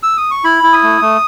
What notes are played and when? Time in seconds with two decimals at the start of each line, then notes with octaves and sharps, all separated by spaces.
0.03 E6
0.17 D#6
0.31 C#6
0.44 E4 B5
0.63 E4
0.73 D#6
0.83 A3
1.01 A3